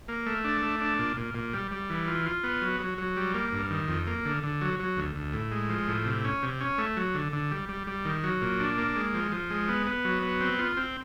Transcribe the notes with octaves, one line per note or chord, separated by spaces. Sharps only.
A#3
A3
D4
A3
D4
A#2
A#2
A#2
G3
G3
E3
F4
F4
B3
F#3
F#3
F#3
G3
A#3
G2
D#3
F2
A#3
D3
D3
F#3
F#3
D2
D2
A2
G#3
F3
A2
C3
C#4
C3
C#4
A3
F#3
D3
D3
G3
G3
G3
D#3
F#3
A#2
D4
A#3
G#3
F3
F3
G#3
B3
B3
F#3
B3
C4
F4
C4